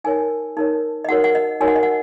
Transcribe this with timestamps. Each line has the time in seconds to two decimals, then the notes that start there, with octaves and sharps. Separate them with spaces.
0.04 D#4 A#4 C#5 G#5
0.57 D#4 A#4 C#5
1.04 D#5
1.08 D#4 F#4 A#4 C#5 F#5
1.24 F#5
1.35 D#5
1.60 D#4 F#4 A#4 C#5 G#5
1.68 F#5
1.76 D#5
1.83 F#5